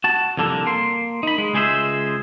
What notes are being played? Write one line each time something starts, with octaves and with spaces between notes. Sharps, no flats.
F#4 A5
C2 F2 D3 A#3 A4
A#3 C6
D#4 B5
G#3
C#2 G#3 G#4 C5 E5